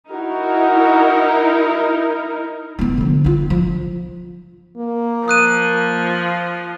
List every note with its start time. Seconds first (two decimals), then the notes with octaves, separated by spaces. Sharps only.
0.12 D#4 E4 F#4 A#4
2.79 B3 E4
2.97 D3 F3
3.24 E4 F4
3.50 F3
4.77 A#3
5.28 F3 D#6 F#6 D#7